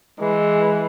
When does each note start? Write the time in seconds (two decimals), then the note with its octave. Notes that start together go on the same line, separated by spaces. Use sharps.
0.20 E3 G#3